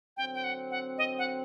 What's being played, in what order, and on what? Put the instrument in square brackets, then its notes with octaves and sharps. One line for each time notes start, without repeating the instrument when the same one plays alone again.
[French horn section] D3 F#3 C4 [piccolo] G5
[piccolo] G5
F#5
F#5
D#5
F#5